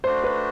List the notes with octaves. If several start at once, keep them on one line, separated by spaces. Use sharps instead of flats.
A3 D4 F#4 C5
B4